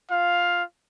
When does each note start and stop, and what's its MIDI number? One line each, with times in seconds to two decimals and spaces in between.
0.11 0.63 65
0.11 0.63 77